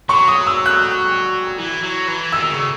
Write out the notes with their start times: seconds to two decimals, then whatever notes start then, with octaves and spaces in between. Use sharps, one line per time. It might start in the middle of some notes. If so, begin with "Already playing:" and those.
0.09 F#3 C#6
0.28 D#6
0.47 E6
0.66 F#6
1.58 E3
1.83 F#3
2.08 E3
2.32 D#3 E6
2.51 C#3